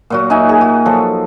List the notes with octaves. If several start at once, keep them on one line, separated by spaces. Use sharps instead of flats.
A#2 F#3 F#4
D#4 F#4 E5 G#5
G#4
F#4
F3 F#3 A4